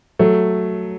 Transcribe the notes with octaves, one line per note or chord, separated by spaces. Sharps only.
F#3 A3